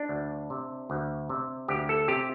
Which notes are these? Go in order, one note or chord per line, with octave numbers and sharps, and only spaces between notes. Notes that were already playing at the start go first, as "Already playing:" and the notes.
Already playing: D4
D2
C3
D2
C3
D2 G4
A4
C3 G4